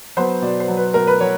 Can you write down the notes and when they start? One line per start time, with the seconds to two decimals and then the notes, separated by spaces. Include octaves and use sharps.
0.17 F#3 B3 C5
0.42 B2 D5
0.60 C5
0.68 F#3 B3
0.77 B4
0.94 B2 A#4
1.07 B4
1.20 F#3 C#5